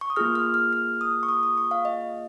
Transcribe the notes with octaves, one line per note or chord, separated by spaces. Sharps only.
C#6
D#6
A#3 F4 G#4 F6
F6
F6
F6
D#6
C#6
D#6
D#6
C#6
F5
D#5